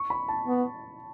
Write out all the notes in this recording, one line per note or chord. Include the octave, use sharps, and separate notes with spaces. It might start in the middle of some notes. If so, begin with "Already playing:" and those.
Already playing: C#6
B5
A5
B3